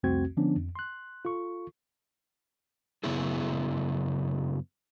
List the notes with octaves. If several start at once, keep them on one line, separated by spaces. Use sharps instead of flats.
C2 F2 A3 C4 F#4 G#6
D3 F3 B3 C#4 D4
F2
C6 F#6
F4 A4 C#6
F#2 C#3 B3 E4 G#4